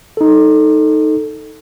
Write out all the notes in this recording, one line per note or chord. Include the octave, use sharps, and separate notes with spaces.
D#4 A4